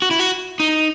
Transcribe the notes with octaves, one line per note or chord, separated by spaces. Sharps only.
F#4
E4
F#4
D#4